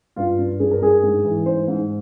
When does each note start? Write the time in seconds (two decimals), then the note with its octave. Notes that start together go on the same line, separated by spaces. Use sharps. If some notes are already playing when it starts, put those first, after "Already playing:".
0.16 G2 F4
0.39 G2
0.60 G2 G#4
0.71 A#4
0.82 G2 G#4
1.03 G#2
1.25 E3
1.46 G#2 C5
1.68 G#2